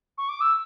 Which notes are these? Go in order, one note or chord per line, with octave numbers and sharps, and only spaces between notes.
C#6
D6
E6